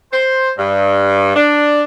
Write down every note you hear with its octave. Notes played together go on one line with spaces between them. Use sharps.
C5
G2
D4